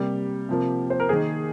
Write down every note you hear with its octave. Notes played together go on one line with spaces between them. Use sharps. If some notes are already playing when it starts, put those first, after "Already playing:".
Already playing: C3 G3 A#3 G4
C3 F3 A#3
C5
A#4
D#3 A#3 G#4